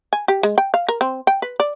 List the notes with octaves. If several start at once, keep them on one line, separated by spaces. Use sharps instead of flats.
G#5
G4
G#3
G5
F5
A#4
C4
G5
B4
D5